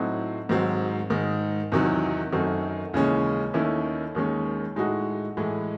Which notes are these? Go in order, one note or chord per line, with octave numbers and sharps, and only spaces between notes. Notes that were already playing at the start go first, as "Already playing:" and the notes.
Already playing: A2 F#3 C4 D#4 F#4
G#2 D#3 F#3 C4
G#2 D#3 G#3 D#4
E2 C3 D#3 F#3
F#2 D#3 A3 C4 F#4
D#2 C#3 E3 G#3 C#4
D#2 D#3 A3 C#4 E4
D#2 D#3 G#3 C#4
A2 G#3 D#4 F#4
A2 E3 G#3